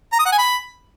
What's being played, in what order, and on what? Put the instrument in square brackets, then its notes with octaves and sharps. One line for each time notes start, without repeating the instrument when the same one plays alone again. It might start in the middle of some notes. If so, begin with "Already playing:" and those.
[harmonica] A#5
D#6
F#5
G#5
B5